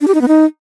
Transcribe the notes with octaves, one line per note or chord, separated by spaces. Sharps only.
D4
G4
D#4
B3
D#4